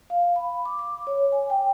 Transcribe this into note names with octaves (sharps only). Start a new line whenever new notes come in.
F5
B5
D6
D6
C#5
G#5
G5